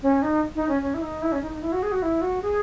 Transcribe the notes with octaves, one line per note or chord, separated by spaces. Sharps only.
C#4
D#4
D#4
C#4
C#4
E4
D#4
E4
C#4
D#4
D#4
E4
F#4
G#4
F#4
E4
F#4
G#4